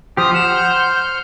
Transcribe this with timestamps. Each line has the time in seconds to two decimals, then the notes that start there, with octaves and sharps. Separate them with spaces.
0.17 F3 G4 C5 D#6 F6
0.34 F#5 E7
0.52 G6